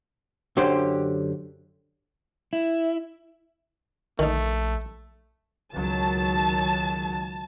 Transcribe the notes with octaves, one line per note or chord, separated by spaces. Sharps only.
F#2 D3 C#4 G4 C5
E4
A#1 D#3 A3 D#4
C#2 D#3 F#3 A5